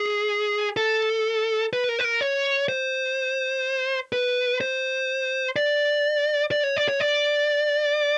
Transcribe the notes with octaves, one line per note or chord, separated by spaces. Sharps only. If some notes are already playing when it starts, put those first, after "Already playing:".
Already playing: G#4
A4
B4
A#4
B4
A#4
C#5
C5
B4
C5
D5
D5
C#5
D5
C#5
D5